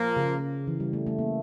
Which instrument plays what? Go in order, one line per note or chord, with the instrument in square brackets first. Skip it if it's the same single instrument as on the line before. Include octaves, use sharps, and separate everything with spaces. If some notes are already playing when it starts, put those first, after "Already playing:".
Already playing: [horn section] A#2 F3 A#3
[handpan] C#3
E3
G3
A3
A3
A#3